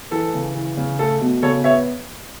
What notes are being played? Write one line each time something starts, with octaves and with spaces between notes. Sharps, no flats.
E3 A4
C#3
E3
C#3
A3 A4
B2
C#3 A4 C#5
B3 C#5 E5